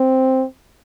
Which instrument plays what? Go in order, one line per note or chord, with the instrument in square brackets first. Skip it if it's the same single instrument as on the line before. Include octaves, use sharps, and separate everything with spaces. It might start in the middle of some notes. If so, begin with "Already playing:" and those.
Already playing: [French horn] C4